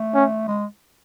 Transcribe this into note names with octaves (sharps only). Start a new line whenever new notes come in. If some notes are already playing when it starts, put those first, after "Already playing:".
Already playing: A3
C#4
G#3